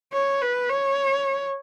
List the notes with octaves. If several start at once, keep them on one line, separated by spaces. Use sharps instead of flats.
C#5
B4
C#5